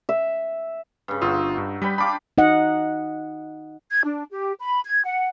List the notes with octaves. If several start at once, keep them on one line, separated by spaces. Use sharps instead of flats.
E5
G2 C#3
G1 D#4 F4 F#4 E6
G2
G3 B4 G5 B5
D4 F4 G4 B5 D6
D#4 D#5 F#5
G#6
D4
G4
B5
G#6
F#5